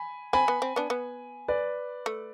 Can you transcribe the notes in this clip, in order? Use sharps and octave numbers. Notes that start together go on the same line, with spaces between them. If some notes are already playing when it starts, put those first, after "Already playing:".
Already playing: G#5 B5
C4 G#5 B5
B3
C4
B3 D4
B3
B4 D5
A3